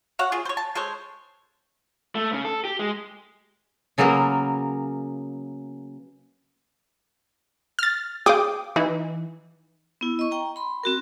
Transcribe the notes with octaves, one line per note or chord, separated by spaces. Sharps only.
F#4 C#5 F5 F#5
G#3 F4 G#4
C5 C#5
A5
G#3 A4 C5 C#5
A3
C#3
A4
G4
G#3
C#3 F#3 A#3 B3 A#4 A#5
F6 A6
G#4 F5 G5 D6 D#6
E3 D#4
B3 E4
D#5 C#6
G5 A#5
B5 C6
C4 F#4 A#4